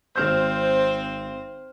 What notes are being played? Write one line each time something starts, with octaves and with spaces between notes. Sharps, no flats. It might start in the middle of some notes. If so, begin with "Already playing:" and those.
G#1 C4 C5 F6 G6